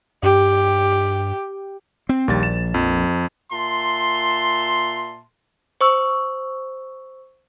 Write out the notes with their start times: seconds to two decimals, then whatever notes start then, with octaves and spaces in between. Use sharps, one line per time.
0.23 G2 G4
2.09 C4
2.28 A#1 D#2 G3 A6
2.43 E7
2.74 F2
3.52 A#2 E5 A5 C6
5.81 C5 C#6 E6